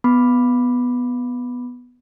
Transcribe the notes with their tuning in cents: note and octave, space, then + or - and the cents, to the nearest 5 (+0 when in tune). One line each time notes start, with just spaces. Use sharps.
B3 +0 B5 +0 D6 +0